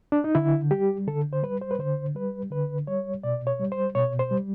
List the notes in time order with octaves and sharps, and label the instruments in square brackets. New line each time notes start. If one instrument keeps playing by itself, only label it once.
[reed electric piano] D4
D#4
D3 E4
G3 G4
D3 A4
C5
G3 B4
C5
B4
D3 C5
G3 B4
D3 B4
G3 C#5
B2 D5
C#5
G3
C5
B2 C#5
C5
G3